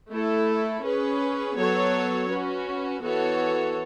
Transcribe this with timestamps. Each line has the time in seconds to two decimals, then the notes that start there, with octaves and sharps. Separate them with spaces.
0.10 A3 E4 A4
0.84 C#4 G#4 B4
1.57 F#3 B3 F#4 A4 C#5
2.30 C#4 F#4 B4
3.02 E3 B3 F#4 A4 C#5